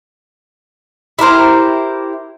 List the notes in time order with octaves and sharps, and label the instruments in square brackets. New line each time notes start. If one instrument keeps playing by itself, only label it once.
[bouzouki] E4 G4 A#4 C5